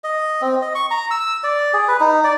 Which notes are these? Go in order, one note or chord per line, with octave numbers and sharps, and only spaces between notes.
D#5
C4
D#5
C#6
A#5
E6
D5
G#4
B4
D#4
D5